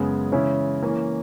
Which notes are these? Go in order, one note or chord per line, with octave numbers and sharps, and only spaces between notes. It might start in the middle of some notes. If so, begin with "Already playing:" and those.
Already playing: F#2 C#3 G#3 B3
C#3 E3 G#3 C#4 E4
E3 A#3 C#4